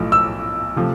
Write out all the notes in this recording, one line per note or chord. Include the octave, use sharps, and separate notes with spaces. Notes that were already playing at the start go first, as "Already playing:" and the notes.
Already playing: B1 A2 F3 A3
E6
C3 F3 A3